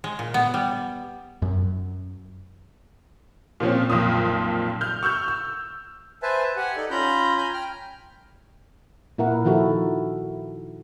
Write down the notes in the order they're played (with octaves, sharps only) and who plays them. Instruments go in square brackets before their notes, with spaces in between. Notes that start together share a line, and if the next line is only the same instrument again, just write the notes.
[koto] G#3
A#2
B3
G3
[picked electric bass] F#2
[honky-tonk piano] A#2 F3 C4 C#4
B1 F2 A#2 C6 D#6
F6 G6
C#6 E6 F6 G6
E6
[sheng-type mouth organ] B4 C5 E5 G#5 A5
G4 F#5 G#5
D#4 A4 D5
C#4 F4 A#5 B5 G6
G#5 A#5 B5 G6
G5 F6
[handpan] A#2 E4 A#4 F#5
D#3 F3 E4 F#4 A4